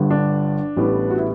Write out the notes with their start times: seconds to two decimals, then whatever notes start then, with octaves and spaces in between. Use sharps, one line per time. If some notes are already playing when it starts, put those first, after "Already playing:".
Already playing: G1 G2 D3
0.11 D4
0.76 A1 A2 G3 B3
1.10 F#4
1.18 E4